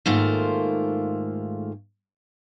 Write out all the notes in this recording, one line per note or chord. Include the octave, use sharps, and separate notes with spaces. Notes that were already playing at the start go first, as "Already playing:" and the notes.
G#2 D#3 A3 A#3 F4 C5